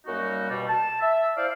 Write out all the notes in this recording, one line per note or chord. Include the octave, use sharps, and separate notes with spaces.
F#2 G3 A#3 D#4 F#4
B2 G3
A5
E5
E4 C5 D5 F5